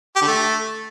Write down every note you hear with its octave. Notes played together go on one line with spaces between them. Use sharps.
G4
D3
A3